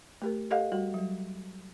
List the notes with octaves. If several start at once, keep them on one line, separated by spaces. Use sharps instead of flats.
A3 G4 A#4
G4 A4 D#5 F5 F#5
G3 F#4
F#3 G3